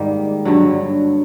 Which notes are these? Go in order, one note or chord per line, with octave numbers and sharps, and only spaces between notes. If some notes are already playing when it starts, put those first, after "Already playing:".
Already playing: G#2 D#3 G3 A#3
G2 D3 F#3